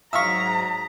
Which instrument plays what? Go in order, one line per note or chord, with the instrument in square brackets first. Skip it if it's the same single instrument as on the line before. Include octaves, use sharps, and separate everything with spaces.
[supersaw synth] G#2 F#3 [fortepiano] E5 F5 C#6 [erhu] A#5 [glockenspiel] D#6 B6